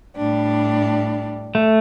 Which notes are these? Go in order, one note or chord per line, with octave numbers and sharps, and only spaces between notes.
A2 G3 D4
A3